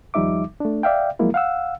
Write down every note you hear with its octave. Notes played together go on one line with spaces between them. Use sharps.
D#2 F3 G3 D#4 E5 D6
A3 D4
D5 E5 F5 G5
F3 F#3 G#3 A#3 E4 A#4
F5 F#5 E6